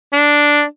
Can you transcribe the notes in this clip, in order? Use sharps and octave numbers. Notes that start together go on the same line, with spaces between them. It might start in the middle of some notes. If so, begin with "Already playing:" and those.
D4